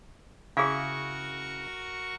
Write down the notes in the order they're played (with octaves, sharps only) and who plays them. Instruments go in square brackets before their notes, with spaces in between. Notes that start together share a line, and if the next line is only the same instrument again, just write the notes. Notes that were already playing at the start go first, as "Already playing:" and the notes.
[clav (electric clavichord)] C#3 E4 [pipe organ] F#4 A#4 C#6 [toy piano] G#4 F5